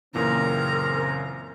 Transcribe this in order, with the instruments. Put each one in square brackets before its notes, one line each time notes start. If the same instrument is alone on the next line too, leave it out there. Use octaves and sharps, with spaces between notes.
[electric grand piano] F#2 A#2 E3 [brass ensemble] C#3 C4 [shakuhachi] A#4 [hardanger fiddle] A#5